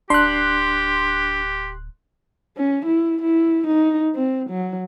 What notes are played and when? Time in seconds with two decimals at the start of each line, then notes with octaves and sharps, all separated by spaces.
0.10 D1 D4 G4 C6 F#6
2.57 C#4
2.86 E4
3.22 E4
3.67 D#4
4.15 C4
4.50 F#3